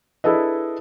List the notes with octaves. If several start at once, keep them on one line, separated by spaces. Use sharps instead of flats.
D4 E4 G#4 A4 B4 D#5